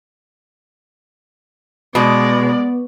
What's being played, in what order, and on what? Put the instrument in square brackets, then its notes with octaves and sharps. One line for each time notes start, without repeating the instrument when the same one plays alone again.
[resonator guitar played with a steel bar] B2 [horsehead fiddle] G#3 D5 [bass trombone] B3